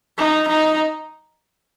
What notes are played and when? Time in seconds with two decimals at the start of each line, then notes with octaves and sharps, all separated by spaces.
0.18 D#4
0.48 D#4